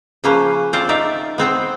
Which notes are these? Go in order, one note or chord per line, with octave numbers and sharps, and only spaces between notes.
C#3 F3 A#3 C#4 B4 C5
C4 F4 C5 D5
D#4 A#4 D5 E5
B3 C4 C5 G5